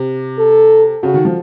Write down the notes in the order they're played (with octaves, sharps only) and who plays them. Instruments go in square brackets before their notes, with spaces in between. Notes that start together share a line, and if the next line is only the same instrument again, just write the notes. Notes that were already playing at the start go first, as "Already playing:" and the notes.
Already playing: [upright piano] C3
[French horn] A4
[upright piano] C#3 [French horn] F#4
[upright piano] D#3
F3